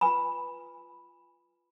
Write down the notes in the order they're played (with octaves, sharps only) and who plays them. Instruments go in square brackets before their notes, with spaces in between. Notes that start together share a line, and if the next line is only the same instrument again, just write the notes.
[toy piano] F4 B4 G#5 B5